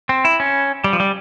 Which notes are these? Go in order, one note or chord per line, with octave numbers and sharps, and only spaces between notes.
C4
E4
C#4
G3
F3
G3